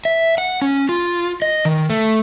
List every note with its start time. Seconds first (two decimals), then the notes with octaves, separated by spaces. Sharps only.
0.05 E5
0.38 F#5
0.62 C#4
0.89 F4
1.42 D#5
1.65 D#3
1.90 A3